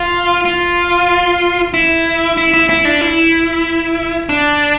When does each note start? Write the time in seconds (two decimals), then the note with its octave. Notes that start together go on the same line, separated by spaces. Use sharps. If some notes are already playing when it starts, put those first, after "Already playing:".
Already playing: F4
0.45 F4
1.74 E4
2.37 E4
2.53 E4
2.69 E4
2.85 D4
3.01 E4
4.29 D4